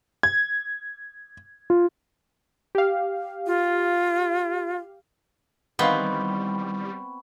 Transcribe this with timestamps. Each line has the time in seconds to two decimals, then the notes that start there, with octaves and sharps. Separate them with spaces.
0.23 G#6
1.70 F4
2.75 G4 F5
3.46 F4
5.79 D#3 E3 G3 B3 C4 F5 B5 C#6